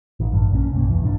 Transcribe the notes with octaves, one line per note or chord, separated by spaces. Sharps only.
A1 D#3
A1 G2
A#1 A#2 C#4
B1 G2 A#3
E1 E2 E3
A1 G2 D4